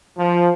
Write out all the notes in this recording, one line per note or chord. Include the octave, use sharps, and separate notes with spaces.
F3